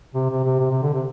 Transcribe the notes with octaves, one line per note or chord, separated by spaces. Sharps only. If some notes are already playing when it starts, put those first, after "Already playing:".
C3
C3
C3
C3
C3
D3
C3